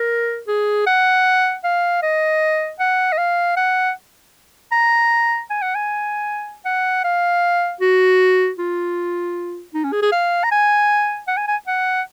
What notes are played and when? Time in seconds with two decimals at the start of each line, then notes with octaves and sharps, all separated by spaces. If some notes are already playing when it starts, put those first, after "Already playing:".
Already playing: A#4
0.47 G#4
0.87 F#5
1.64 F5
2.03 D#5
2.80 F#5
3.12 D#5
3.18 F5
3.57 F#5
4.72 A#5
5.50 G#5
5.62 F#5
5.75 G#5
6.65 F#5
7.04 F5
7.81 F#4
8.59 F4
9.74 D#4
9.84 C#4
9.92 G#4
10.02 G#4
10.12 F5
10.44 A#5
10.51 G#5
11.28 F#5
11.37 G#5
11.48 G#5
11.67 F#5